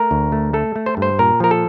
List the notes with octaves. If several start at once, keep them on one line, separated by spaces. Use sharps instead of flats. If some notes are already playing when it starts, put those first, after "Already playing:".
Already playing: A3 A#4
D2
A3
A3 A4
A3
C5
G2
C5
A#2 A#4
F3 A#4
A4